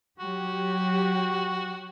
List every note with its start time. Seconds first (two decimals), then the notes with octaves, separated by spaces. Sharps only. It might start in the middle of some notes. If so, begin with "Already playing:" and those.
0.20 F#3 F#4 G4